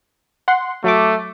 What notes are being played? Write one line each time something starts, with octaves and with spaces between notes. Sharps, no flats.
F#5 C6
F#3 A3 D6